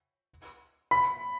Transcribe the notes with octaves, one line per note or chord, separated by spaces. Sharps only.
B5